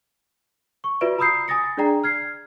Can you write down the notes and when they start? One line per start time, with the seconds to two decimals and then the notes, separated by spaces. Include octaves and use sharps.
0.84 C#6
1.01 F4 F#4 B4 D5 E5 D7
1.19 A#5 B5 D#6 E6 G6 C7
1.48 G#5 D#6 A6 A#6 C#7
1.77 D4 G#4 D5 G5 A#5
2.04 F6 G#6 C7